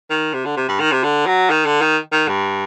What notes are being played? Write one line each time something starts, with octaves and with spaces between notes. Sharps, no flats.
D#3
C3
D3
C3
G2
D#3
C3
D3
F#3
D#3
D3
D#3
D#3
G2